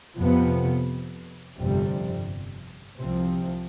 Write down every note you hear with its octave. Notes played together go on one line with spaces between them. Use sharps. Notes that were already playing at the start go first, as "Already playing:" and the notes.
F2 C3 F3 B3
G1 F2 C3 G3
C2 C3 F3 C4